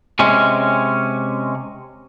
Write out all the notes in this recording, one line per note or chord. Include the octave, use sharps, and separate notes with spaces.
C3 G#3 C#4